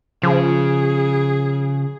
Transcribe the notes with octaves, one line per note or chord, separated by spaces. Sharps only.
C#3 F3 G#4